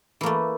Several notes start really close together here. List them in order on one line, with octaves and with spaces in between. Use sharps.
E3 A#3 A3